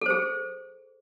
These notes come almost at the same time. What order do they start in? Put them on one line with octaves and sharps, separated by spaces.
A4 C5 G#4